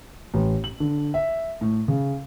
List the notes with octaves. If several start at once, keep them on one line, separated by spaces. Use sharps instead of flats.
A1
F#7
D3
E5
A2
C#3